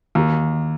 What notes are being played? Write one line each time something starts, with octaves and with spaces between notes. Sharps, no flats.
D#2